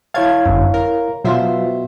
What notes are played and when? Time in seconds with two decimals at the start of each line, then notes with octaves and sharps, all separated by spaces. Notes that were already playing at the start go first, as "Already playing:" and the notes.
0.14 E4 C#5 F5 A5 G#6
0.46 G1 F#2
0.74 A#4
1.24 B2 F#3 F4 C5 E5